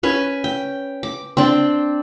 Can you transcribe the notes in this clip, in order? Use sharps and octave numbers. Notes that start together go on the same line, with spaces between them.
C#4 B4 G#5
G5
D6
C4 D4 D5 G5